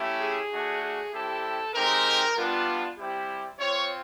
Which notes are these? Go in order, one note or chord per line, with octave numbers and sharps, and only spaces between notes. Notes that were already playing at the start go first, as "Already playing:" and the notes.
Already playing: A3 C#4 E4 G4
G#4
A3 D4 F#4
G#4
G3 C4 E4 G4 A4
G#3 C4 D#4 G4 A#4
G3 B3 D4 F4
G3 C4 E4 G4
C4 F4 C#5